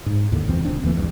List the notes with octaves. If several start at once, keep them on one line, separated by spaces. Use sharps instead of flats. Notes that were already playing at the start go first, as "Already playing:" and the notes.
G#2
D#2 A2 D3 D#3
C2 F2 E3 C4
D1 C#2 C4 D4
D#2 D3 E3 A3
B1 E2 G2